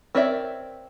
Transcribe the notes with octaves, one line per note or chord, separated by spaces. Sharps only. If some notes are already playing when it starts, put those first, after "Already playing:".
C4 A#4 C#5 D5 E5